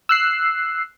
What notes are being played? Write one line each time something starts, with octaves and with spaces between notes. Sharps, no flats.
E6 F#6 C7